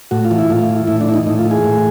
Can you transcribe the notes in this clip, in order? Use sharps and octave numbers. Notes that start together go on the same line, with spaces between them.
A2 F#4
F4
E3
E4
A2 F4
E3
A2 E4
D4
E3 E4
D#4
A2 D#4
F4
E3
G#4
A2